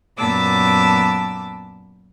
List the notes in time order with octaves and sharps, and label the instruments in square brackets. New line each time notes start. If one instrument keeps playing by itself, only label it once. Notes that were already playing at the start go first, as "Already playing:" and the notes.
[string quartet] F#2 A#2 B3 A5 D6 E6